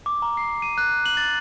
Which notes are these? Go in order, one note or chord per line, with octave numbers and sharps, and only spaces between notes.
D6
A#5
C7
D#7
F#6
F#7
A6